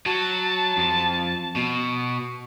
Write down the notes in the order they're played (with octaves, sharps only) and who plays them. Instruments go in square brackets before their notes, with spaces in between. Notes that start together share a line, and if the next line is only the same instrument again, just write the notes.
[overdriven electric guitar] F#3 [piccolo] A5
[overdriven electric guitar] F2
B2